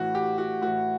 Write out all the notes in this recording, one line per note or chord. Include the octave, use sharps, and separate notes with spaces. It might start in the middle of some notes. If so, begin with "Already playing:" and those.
Already playing: A2 E3 F#4
G4
F#4
A2 E3 F#4